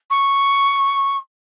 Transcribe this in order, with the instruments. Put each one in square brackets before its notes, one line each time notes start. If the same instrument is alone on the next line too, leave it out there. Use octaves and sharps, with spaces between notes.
[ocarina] C#6